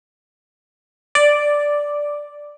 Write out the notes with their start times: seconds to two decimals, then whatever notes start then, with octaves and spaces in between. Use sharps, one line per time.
1.15 D5